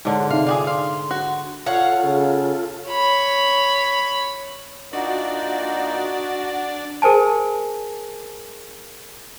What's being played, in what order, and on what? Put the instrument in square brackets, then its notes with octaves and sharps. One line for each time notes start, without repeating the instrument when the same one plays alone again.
[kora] G#2 D3 [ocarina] C#5
[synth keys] C3 D#4 [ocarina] E5 [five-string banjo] F5
[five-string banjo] F4 F#4 G#4 [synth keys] D5 [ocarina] D6
[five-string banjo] F5 [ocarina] C6
[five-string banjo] F#4
[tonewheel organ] F4 A4 [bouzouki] C#5 F5 F#5
[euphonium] C#3
[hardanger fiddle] C#5 B5
[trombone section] A#2 D#4 [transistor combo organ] D4 [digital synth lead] F#4
[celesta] G#4 A#4 C5 G#5 A5